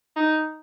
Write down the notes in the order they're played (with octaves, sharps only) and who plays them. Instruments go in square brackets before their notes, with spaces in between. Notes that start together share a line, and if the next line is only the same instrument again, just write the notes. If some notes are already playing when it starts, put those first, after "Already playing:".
[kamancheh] D#4